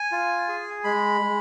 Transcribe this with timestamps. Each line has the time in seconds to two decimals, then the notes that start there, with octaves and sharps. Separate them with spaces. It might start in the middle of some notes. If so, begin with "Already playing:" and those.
Already playing: G#5
0.12 F4
0.48 G#4
0.84 G#3 B5
1.21 G#3